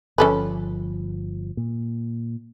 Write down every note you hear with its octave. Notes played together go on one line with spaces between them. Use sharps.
G1 F3 C#4 A4 B4
A#2